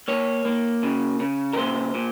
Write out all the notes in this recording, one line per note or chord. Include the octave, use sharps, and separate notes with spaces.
A#3 C#5
A#3
C#3
C#3
A#4
A#2 C5
A#2